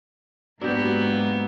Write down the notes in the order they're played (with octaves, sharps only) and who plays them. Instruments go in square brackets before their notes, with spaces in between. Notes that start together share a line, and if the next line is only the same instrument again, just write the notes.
[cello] G#2 A#3 [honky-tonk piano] F#3 [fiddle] B3 [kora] D4 G4